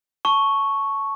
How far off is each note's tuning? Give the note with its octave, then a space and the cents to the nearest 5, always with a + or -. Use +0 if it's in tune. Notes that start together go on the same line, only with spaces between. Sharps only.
A5 +0 C#6 +0